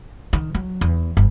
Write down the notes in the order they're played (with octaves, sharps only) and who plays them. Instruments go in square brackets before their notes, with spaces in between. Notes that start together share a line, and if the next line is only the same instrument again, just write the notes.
[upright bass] D#3
F#3
E2
G1